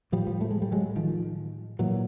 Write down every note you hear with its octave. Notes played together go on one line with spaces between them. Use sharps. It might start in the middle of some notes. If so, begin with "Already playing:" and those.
A2 F3 G3
F3 G3
A3
G#3
G3
F#3 G#3
D#3 F3
A#2 E3 F#3